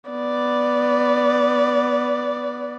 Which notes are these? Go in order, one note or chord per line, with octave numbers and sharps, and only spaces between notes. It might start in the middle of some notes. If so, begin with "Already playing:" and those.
B3 D5